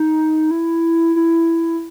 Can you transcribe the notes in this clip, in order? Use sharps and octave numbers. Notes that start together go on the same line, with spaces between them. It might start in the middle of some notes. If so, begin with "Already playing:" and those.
Already playing: D#4
E4
E4